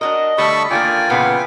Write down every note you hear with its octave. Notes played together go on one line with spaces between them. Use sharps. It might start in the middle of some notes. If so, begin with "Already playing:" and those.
D4 F#4 A#4 D#5
D3 G3 A3 A5 B5 C#6
D3 D#3 A#3 F4 D5 G5 G#5
A#2 C#3 E3 B3